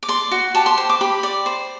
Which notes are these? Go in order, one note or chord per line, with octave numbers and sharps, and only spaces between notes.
D6
D5 C6
F#4
G4 A5
C6
C5 C6
D6
G4 B5
D5
C5